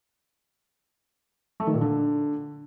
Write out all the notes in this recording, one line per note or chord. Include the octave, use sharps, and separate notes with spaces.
A3
D#3
A#2
D3